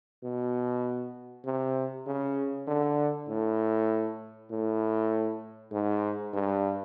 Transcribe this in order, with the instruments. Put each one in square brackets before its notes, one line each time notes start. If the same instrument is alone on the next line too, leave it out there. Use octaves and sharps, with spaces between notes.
[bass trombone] B2
C3
C#3
D3
A2
A2
G#2
G2